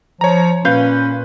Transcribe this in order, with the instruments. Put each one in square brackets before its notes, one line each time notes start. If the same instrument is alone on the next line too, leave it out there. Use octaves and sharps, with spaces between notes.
[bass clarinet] F3 [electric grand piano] C#5 A#5
[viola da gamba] A#2 [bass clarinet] C#4 [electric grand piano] B4 G6 [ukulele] F5